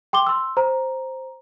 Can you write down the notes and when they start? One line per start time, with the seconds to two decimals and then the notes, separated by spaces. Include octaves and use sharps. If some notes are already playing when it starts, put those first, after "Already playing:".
0.13 G5 C6 D6 G7
0.27 C6 E6
0.57 C5 A#5